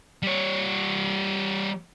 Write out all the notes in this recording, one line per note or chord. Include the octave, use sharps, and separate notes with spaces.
G3 C#5